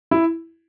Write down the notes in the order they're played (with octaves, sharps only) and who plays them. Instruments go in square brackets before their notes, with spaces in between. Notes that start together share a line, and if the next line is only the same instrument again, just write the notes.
[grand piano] E4